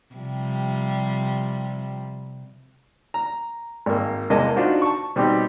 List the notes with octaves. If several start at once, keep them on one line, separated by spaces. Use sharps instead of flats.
C3 F3 G3
A#5
G#1 A#3
E2 C3 G#3 A#3 D#5 A5
D4 D#4 F4 F#4 C5
A5 C#6
B2 G3 C4 D#4 G4